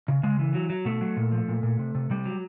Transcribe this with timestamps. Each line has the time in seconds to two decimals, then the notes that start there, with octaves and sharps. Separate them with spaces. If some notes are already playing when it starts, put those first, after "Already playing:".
0.08 C#3
0.23 C#3 G#3
0.39 E3
0.54 F#3
0.70 F#3
0.85 B2 A3
1.01 F#3
1.17 A#2
1.32 F3
1.48 A#2
1.63 A#2
1.79 C3
1.95 C3
2.10 C3 G3
2.25 F#3